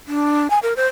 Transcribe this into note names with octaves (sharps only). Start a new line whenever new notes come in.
D4
G#5
A#4
C5